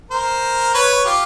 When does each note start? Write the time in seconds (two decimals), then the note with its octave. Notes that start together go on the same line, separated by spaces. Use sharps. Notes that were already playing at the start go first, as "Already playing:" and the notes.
0.10 A#4 C5
0.74 B4 C#5
1.05 F4 G4